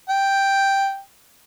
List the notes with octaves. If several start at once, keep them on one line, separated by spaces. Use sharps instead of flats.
G5